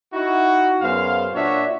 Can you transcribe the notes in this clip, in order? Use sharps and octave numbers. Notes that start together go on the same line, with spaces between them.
D#4 E4 F#4
F#2 B3 G#4 C5 F5
A#2 D4 F4 F#4 C#5 E5